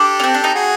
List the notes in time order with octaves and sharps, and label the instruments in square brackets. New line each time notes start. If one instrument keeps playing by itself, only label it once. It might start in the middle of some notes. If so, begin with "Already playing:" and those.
Already playing: [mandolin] D4 [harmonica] G4 A4
[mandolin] C#4
C4
D4
D#4
[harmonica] F#4 G#4